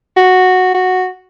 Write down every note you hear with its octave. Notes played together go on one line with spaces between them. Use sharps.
F#4
F#4